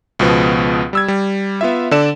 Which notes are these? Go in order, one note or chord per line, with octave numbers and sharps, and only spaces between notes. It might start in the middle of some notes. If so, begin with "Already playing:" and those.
C#2 B2 F3 B3
G3 E6 G#6
G3
B3 F4 E5
D3 A4 D5 E7